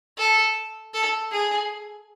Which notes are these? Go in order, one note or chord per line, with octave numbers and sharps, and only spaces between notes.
A4
A4
G#4